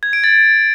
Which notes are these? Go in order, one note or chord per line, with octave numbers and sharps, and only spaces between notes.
G#6
D7
A6